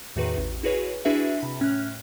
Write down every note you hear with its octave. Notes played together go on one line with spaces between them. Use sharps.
E2 A2 D#3 F#4 G#4 B4
A1
E4 F#4 G#4 B4 C#5
D4 E4 F#4 G#4 B4 E5
C3 B5
A2 C#4 F6 F#6